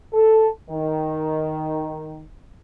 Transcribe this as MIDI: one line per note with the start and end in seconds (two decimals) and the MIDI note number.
0.13 0.48 69
0.70 2.23 51